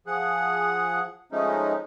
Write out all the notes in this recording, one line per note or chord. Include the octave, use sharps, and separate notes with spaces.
F3 G#4 F#5
F3 G#3 A3 C#4 D#4